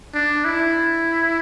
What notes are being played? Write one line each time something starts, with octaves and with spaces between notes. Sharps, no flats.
D4
E4